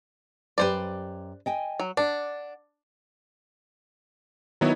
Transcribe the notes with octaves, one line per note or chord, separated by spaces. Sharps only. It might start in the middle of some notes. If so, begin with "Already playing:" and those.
F#2 G4 B4 C5 D5
D#5 G5 G#5
F#3
D4 D5 F#5
D#3 F#3 B3 D#4 E4 C#5